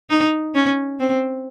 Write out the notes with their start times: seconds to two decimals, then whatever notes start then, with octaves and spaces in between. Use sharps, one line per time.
0.10 D#4
0.55 C#4
1.00 C4